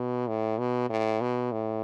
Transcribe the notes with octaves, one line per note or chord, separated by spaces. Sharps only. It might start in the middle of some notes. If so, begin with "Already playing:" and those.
Already playing: B2
A2
B2
A2
B2
A2